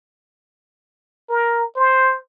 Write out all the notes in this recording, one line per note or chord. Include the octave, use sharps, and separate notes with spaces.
A#4
C5